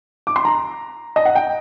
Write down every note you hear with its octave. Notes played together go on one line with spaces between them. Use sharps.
D6
C6
A#5
D#5
F#5
G5